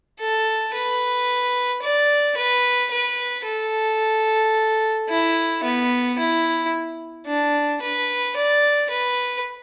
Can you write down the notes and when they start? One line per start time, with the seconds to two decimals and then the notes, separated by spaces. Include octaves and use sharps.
0.19 A4
0.73 B4
1.82 D5
2.37 B4
2.91 B4
3.45 A4
5.09 E4
5.64 B3
6.19 E4
7.27 D4
7.82 B4
8.36 D5
8.90 B4